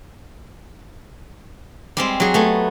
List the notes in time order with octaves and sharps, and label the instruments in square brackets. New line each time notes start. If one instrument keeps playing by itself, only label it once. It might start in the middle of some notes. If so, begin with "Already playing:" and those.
[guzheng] G3 G#3 C4
F#3 G#4
A3 B3